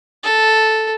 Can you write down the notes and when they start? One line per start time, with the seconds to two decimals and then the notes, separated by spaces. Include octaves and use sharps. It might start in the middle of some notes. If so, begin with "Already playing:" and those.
0.24 A4